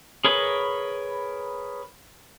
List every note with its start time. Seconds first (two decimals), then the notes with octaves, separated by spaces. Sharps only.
0.24 G#4 A#4 B4 C#5 B5